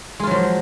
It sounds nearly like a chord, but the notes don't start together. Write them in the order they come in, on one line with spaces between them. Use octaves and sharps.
G#3 F4 F#3 F3